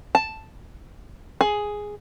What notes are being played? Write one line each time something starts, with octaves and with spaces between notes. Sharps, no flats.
A5
G#4